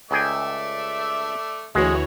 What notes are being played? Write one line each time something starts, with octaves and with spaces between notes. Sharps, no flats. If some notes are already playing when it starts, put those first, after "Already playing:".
C#2 A3 G#4 D5 E5 G5
D2 E3 G#3 F#4 C#5